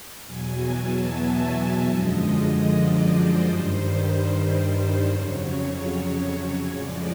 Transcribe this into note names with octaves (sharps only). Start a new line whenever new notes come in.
E2 B2 F#3 G#5
A5
E5
F#2 D3 F3 G#3 D#5
D5
C5
G2 D#3 G3
F2 C#3 F#3 C#5
A2 F3 G#3 D5